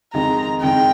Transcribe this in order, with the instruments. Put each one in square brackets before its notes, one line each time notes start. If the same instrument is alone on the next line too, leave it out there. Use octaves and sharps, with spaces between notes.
[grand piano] F2 D#3 G#3 D#4 [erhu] A#5
[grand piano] F2 D#3 G#3 D#4 [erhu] G5